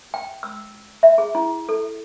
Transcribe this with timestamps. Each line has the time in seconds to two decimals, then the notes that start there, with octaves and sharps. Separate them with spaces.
0.14 G5
0.43 E6
1.03 E5
1.18 G#4
1.35 E4
1.69 A4